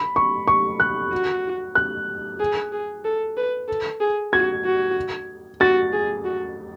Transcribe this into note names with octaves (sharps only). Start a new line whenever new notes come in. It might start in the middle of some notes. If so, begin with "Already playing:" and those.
Already playing: B5
C#6
C#6
F#6
F#4
F#6
G#4
G#4
A4
B4
A4
G#4
F#4 G#6
F#4
F#4 A6
G#4
F#4